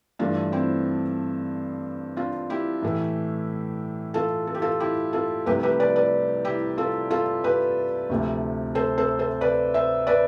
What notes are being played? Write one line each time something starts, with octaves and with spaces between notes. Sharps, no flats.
G2 E3 A3 D4 F4
C4 E4
D4 F4
E4 G4
A2 E3 A3
F4 A4
A4
G4
F4 A4
E4 G4
F4 A4
C2 C3 F3 A3 G4 B4
G4 B4
B4 D5
B4 D5
E4 G4
F4 A4
F4 A4
G4 B4
D2 C3 F3 A3
A4 C5
A4 C5
A4 C5
B4 D5
C5 E5
B4 D5